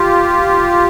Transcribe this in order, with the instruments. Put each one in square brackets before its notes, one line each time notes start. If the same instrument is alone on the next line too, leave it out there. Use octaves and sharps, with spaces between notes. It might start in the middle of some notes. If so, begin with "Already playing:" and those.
Already playing: [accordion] F4 G4